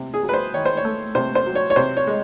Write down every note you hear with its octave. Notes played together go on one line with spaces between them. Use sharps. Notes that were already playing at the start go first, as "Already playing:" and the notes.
Already playing: C3
G#4
F#3
B4
C5
D#3 C#5
C5
C#5
A3
C3 C5
C5
F#3
C#5
C#5
C3 C5
C#5
G#3